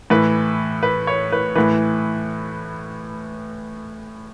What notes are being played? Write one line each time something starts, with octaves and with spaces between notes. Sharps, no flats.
A2 E3 B4
B4
C#5
B4
A2 E3 B4